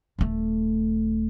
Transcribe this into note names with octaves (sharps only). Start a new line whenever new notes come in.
D#1 A3